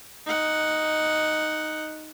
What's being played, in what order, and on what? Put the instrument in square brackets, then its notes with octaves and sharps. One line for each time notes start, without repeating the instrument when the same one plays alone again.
[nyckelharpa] D#4 F#5